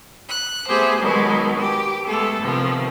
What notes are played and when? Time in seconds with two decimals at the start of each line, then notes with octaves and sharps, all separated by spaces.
0.28 F#6
0.68 A3 B3 G4 G#4 C5
1.01 B2 D#3 F#3 G#3 B3
1.60 G4
2.07 G#3 A3 B3 A4
2.40 C3 D#3 F3 B3